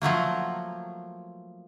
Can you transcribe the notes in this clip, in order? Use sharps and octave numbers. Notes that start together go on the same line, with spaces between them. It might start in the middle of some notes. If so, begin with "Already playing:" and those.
F3 F#3 A3 A#3